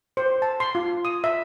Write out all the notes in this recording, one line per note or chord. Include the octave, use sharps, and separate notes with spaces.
C5
A5
C6
F4
D#6
E5